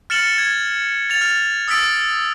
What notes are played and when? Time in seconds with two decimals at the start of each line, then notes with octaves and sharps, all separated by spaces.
0.10 F6 A6 C#7 E7 F#7 G7
0.38 G#6
1.10 A6 F7
1.21 F6
1.68 D#6 E6 A6 B6 D7